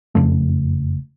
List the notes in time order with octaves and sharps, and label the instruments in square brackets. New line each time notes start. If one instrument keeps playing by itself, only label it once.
[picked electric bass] F#1 F2 C#3 A3